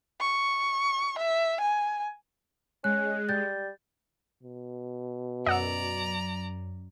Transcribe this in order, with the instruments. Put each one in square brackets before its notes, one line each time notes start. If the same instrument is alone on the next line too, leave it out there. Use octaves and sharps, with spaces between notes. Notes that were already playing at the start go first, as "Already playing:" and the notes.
[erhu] C#6
E5
G#5
[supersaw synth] G#3 [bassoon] C#4 [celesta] F#6
[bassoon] G3 [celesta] G6 A6
[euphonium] B2
[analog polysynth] F#2 [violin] D5 A#5 [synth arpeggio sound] D#5 F#5 E6